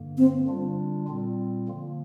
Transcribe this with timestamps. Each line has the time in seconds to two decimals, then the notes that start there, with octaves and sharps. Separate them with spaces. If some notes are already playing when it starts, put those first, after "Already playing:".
Already playing: G2 D3 A#3
0.18 C4
0.48 D3 G3 D4 F4
1.08 A#2 G3 C4 F4
1.68 D3 F3 A#3